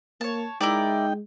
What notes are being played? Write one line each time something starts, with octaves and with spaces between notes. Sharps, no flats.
A#3 C#5 A5
G#3 D#4 E4 A#4 D5 G5